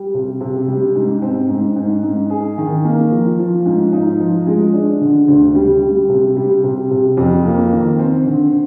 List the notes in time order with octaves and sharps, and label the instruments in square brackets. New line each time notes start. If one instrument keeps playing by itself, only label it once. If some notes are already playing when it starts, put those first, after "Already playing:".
Already playing: [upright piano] G3
C3
C3
G3
G#2
C4
G#2
G#2
G#2
G#4
D#3
A#3
F3
F3
G#2
D#4
F3
G#3
D4
D3
D2
G3
G3
C3
G3
C3
C3
F2
A#3
D#3
C4
D3